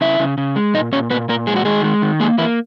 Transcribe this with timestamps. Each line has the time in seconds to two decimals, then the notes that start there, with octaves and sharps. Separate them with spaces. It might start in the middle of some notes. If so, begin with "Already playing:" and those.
0.01 C#3 E4 E5
0.19 C#3
0.38 C#3
0.56 G#3
0.74 A#2 D#4 D#5
0.92 A#2 C#4 C#5
1.10 A#2 B3 B4
1.29 A#2 A#3 A#4
1.47 G#3 G#4
1.56 F#4
1.65 D#3 G#3 G#4
1.84 G#3
2.02 D#3
2.20 G#3 A#3 G#4
2.38 E3 A#3 E4